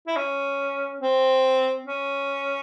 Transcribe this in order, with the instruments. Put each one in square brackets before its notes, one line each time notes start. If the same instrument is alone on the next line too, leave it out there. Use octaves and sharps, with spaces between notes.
[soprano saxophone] E4
C#4
C4
C#4